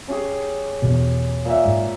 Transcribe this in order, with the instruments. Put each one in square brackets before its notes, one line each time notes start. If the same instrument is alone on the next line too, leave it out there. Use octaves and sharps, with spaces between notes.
[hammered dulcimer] C#4 G4 G#4
[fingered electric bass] E2 B2
[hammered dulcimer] A#2 E5
[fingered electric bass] G#2